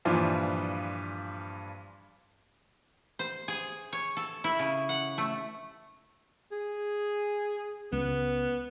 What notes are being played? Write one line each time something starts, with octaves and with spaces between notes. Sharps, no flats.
G2 A#2 E3 F3 F4
C5
G#4
C#5
A4
E4
C#3
F#5
A3
G#4
C#2 B3